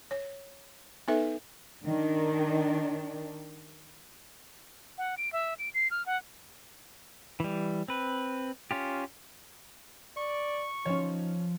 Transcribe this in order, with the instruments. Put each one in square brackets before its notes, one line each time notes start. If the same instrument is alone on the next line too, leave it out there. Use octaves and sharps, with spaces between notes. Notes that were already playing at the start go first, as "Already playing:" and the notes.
[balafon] C#5
B3 D#4 A4 B4 E5
[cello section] D#3 D4
[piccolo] F#5
D7
E5
D7
C7
F6
F#5
[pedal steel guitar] E3 G3
C4 B4
C#4 F4 G4
[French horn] D5 [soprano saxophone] C#6
[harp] F3 [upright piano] C#4 C#5 [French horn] D#4